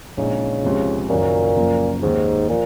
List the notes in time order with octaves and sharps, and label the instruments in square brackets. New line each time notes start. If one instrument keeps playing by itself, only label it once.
[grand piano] A#1 A#2 G#3 D#4 [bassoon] C#3
[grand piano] C#2 C3 F3
[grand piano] F#1 F#2 D#3 F#3 C#4 [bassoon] A#2
[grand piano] F#1 F#2 F3 A#3
[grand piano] D#2 D#3 A#3 C#4 [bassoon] G#2
[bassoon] A#2 [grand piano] F3